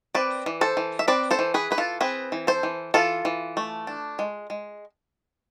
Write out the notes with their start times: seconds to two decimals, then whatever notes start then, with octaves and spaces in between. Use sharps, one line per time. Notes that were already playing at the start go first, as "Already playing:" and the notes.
0.15 C4 B4 D5
0.46 E3
0.61 A4 C5
0.77 E3
0.99 E5
1.08 C4 B4 D5
1.31 A4 C5
1.39 E3
1.54 G#4 B4
1.71 E3 B4
1.78 F4 A4
2.01 C4 G#4 B4
2.32 E3
2.47 A4 C5
2.63 E3
2.94 E3 F4 A4
3.25 E3
3.57 A3
3.87 D4
4.19 G#3
4.50 G#3